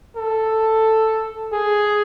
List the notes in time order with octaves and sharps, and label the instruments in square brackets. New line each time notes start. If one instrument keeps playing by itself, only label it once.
[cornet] A4
G#4